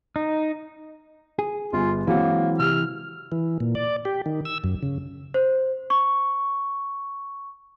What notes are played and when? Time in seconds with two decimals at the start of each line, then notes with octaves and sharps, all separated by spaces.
0.16 D#4
1.39 G#4
1.73 G1 F4 G#5
2.07 E3 F#3 G#3 A#3 C4 F#4
2.59 C3 E6 F6
3.32 E3
3.60 A#2
3.75 D5
4.05 G4
4.26 D#3
4.45 E6
4.64 F#2
4.83 C#3
5.34 C5
5.90 C#6